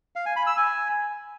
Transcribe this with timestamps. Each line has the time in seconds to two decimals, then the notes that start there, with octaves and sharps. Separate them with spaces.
0.16 F5
0.26 G#5
0.36 B5
0.47 E6
0.57 G#5